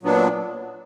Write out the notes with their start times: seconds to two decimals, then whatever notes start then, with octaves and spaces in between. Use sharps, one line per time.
0.03 A#2 F#3 B3 D4